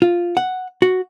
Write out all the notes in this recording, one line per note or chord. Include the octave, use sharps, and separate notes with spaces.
F4
F#5
F#4